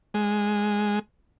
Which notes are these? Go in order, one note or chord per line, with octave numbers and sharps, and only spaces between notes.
G#3